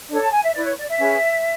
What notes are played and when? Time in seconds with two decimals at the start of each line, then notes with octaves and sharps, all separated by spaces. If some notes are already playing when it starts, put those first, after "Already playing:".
0.09 D4 A4 C#5 D5
0.19 A5
0.32 G#5
0.43 E5
0.53 E4 B4 D5
0.64 C#5
0.76 D5
0.87 E5
0.98 C#4 G#4 B4